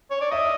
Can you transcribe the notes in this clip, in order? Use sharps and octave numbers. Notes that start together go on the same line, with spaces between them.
C#5
D5
D#5 E5